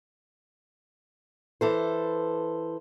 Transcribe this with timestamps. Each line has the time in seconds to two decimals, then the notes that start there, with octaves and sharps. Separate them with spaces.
1.61 E3 A4 C5